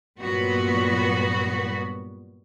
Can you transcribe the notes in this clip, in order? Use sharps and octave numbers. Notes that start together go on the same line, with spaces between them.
G2 A#2 F#3 G3 B3 F#4